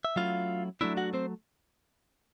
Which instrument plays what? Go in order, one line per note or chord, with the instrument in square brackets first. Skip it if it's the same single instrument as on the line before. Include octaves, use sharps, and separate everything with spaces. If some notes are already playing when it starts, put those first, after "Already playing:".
[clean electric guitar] E5
F#3 A3 C#4 E4 F4 F5
F#3 A3 D4 E4 E5
F#4 F#5
C4 C5